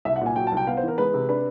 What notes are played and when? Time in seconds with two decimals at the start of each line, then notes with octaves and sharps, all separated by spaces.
0.05 C2 E5
0.16 F#5
0.21 A#2 G#5
0.36 F#3 G5
0.47 A5
0.52 C2 G5
0.67 B3 F5
0.77 C5
0.83 E3 A#4
0.98 G#3 B4
1.14 C3
1.29 D4 B4